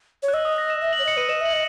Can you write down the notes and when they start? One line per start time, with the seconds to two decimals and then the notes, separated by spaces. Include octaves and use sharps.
0.23 C#5
0.28 F#6
0.34 D#5 E6
0.45 D#6
0.58 A#6
0.70 E7
0.81 E5 E7
0.93 F#7
0.99 C#5
1.05 D#5 C#7
1.17 B4 D#7
1.29 D#5 E7
1.41 E5 F#7
1.53 D#5